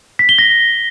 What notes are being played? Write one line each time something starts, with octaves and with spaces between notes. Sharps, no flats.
B6
G7
A#6